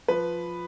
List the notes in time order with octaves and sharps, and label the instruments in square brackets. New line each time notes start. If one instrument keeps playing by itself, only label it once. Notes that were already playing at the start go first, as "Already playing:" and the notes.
[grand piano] F3 B4